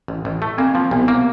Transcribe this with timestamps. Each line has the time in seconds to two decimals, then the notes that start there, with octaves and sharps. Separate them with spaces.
0.08 A1
0.25 A1
0.42 A3
0.58 A#3 C4
0.75 F3
0.91 C2 B3
1.08 A#3